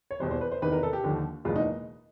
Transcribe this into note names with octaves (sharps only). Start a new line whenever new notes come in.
C#5
E2 B2 G3 C5
C5
B4
C5
E2 C3 D#3 B4
A#4
A4
G4
D#2 D3 F3
F#1 E2 B2 G#3 F4
D#4